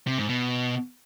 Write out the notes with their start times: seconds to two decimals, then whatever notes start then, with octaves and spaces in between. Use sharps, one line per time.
0.07 C3
0.18 G#2
0.29 B2